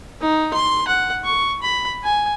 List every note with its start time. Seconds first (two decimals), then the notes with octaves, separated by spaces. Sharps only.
0.21 D#4
0.54 C6
0.88 F#5
1.24 C#6
1.62 B5
2.04 G#5